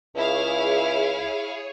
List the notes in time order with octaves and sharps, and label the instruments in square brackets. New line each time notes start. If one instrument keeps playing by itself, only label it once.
[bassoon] C#2 [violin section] E4 F5 [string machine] G#4 C#5